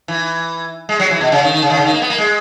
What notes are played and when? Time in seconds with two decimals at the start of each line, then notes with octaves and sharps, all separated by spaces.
0.08 E3
0.89 G#3
1.00 F#3
1.11 E3
1.21 B2
1.32 C#3
1.43 D#3
1.53 D#3
1.62 C#3
1.70 D#3
1.77 C#3
1.85 D#3
1.94 A#3
2.02 B3
2.10 A#3
2.18 G#3